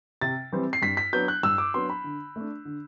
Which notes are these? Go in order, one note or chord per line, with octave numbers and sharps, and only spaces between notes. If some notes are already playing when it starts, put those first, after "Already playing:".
C3 A6
E3 G3 C4
C7
G2 B6
B6
F#3 B3 D4 G6
F#6
G2 E6
D6
F#3 B3 D4 C6
B5
D3
A3 D4
D3